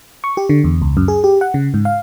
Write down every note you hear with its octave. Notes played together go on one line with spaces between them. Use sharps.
C#6
G4
D3
E2
C#2
F#2
G#4
G4
F#5
C#3
G#2
F5